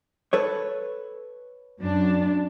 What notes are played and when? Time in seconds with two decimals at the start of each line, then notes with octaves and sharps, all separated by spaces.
0.33 A4 B4 C#5
1.81 F#2 D4